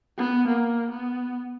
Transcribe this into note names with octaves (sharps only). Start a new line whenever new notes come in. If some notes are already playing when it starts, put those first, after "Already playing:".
B3
A#3
B3